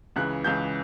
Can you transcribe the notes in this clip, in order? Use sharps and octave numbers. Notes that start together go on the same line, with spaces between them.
C#2 C#3 E3 F#6
C#2 C#3 E3 G6